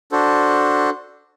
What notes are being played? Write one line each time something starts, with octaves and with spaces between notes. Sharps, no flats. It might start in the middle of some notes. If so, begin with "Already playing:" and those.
D4 F#4 A4 C5